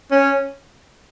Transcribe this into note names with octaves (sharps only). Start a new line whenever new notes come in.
C#4